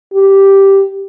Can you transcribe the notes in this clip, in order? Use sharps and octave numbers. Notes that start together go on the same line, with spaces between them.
G4